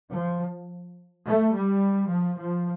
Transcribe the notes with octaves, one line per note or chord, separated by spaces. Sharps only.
F3
A3
G3
F3
F3